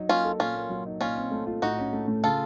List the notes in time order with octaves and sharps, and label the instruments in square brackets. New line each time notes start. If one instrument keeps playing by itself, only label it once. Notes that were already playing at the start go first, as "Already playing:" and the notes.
Already playing: [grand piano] F#3 D#4
[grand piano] A#3 [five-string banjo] C#4 F4
[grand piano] A4
[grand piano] A#2 [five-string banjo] C#4 F4
[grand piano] A#3
F#3
D#4
[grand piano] A#2 [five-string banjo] C#4 F4
[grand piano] C4
A3
F4
[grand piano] A2 [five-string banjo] D#4 F#4
[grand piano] C#4
A3
A2
[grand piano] C#3 [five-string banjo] F4 A4